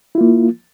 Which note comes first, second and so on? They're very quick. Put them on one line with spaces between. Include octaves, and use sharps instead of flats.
E4 F4 A#3